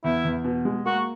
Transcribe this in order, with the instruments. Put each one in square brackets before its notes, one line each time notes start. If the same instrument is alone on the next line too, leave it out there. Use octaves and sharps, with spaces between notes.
[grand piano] E2 [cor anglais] E4
[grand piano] E2
B2
G#3
[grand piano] A#3 [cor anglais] F#4